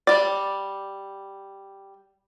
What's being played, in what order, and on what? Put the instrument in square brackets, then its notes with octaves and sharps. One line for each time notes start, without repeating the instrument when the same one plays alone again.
[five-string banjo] G3 D5